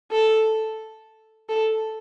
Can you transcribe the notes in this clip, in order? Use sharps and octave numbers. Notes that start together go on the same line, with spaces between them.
A4
A4